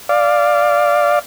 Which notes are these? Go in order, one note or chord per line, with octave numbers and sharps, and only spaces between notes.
D5 F5